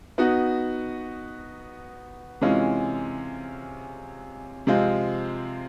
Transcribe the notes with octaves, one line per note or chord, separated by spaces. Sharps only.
B3 D#4 F#4
C3 E3 G#3 C#4 F4
C3 F3 G#3 C4 F4